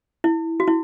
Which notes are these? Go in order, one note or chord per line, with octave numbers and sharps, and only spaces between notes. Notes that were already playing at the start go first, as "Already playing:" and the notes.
E4
F#4
E4